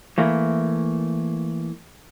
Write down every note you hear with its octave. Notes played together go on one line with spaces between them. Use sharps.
E3 A3 A#3